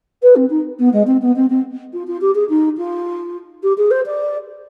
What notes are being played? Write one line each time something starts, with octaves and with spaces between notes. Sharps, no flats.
B4
C4
D#4
B3
G#3
C4
B3
C4
C4
F4
F4
G4
G#4
D#4
F4
G4
G#4
C5
D5